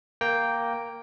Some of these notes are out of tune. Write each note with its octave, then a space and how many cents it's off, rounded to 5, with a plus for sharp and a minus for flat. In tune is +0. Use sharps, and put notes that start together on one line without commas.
A#3 +0 G5 +0 A#5 +0